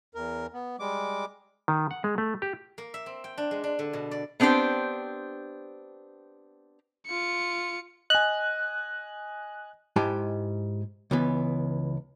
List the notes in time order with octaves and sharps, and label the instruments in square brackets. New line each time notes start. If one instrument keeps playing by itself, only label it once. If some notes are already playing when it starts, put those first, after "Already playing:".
[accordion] E2 A#4
B3
G3 G#3 D6
[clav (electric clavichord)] D#3
F#5
G#3
A3
G4
[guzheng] A#3
E5
C4
G5
D4
G#3
D4
D3
B2
D5
[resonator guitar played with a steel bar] B3 C4 D4 G4 C5
[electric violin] F4 C#7
[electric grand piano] D#5 G#5 [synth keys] F#6
[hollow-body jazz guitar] G#2 G#3 E4 G4 G#5 A5
C#2 E3 B3